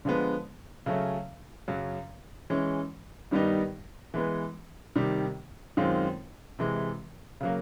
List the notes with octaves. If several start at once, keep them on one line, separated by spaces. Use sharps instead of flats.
D3 F3 G#3 B3
C#3 F#3 A3 C#4
F#2 C#3 F#3
E3 G#3 C#4
G2 D#3 G3 B3 D#4
E3 G#3 B3
C3 D#3 G3
F#2 D#3 G#3 C4 F4
C3 E3 G#3
C#3 F#3 A#3